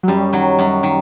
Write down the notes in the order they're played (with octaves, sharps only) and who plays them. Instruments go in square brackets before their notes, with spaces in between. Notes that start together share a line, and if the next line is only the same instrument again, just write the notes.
[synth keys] F#3
[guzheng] F#2 [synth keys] G3
[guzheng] D#3 F#3
F#2
D#3